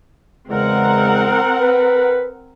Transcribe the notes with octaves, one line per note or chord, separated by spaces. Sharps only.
E2 C#3 G#3 C4 A#4 F#5
B4